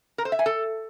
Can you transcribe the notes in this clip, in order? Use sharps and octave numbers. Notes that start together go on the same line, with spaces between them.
A#4
C5
E5
G#5
A4